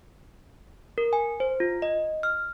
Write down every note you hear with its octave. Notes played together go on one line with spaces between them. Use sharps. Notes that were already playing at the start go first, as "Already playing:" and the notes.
A#4
G#5
C5
F4
D#5
F6